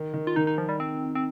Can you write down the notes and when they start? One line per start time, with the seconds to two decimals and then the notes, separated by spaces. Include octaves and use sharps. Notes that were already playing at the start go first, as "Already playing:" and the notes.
Already playing: D#3
0.14 D#3
0.27 F4
0.36 D#3 D#4
0.47 D#4
0.58 F3
0.69 G3
0.80 C4
1.15 C4